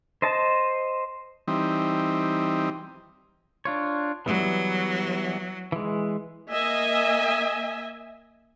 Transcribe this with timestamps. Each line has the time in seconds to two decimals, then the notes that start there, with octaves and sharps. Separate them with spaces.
0.22 C5 D#5 A5
1.48 E3 G3 C4 D#4
3.65 D4 F4 C#5
4.26 E3 F#3 G3 B3
5.72 E3 G#3
6.50 A#3 D#5 E5 G#5